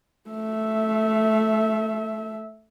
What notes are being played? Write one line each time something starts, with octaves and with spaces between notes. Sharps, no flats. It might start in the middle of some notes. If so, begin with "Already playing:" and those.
A3 E5